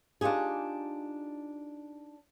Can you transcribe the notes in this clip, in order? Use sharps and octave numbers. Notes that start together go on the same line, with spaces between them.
D4 D#4 F4 G4 G#4